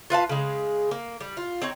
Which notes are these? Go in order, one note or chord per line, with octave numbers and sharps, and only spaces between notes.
F4 B4 F5 A5
C#3 G#3
A#3
G3
F4
C4 D#4 C#5